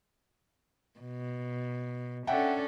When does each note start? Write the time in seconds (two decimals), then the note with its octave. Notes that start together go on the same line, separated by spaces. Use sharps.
1.00 B2
2.27 C#4 D4 A4 E5 F#5 G5